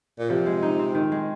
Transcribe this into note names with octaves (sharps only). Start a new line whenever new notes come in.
A#2
C3 F3
G#3
D#4
C4
D#3
G#3